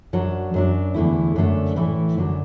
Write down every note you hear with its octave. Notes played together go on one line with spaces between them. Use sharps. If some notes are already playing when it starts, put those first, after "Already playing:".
F#2 F#3 D4
F#2 F#3 D4
E2 D3 A3 E4
F#2 D3 F#3 A3 D4
A2 E3 A3 E4
F#2 D3 F#3 D4